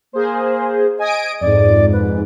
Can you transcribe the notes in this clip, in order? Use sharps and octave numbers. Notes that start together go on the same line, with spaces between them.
A#3 G#4 C5
D#5 G#5 D#6 D7
F2 G#2 D5
B4